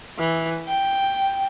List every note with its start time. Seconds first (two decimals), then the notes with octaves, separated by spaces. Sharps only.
0.18 E3
0.67 G5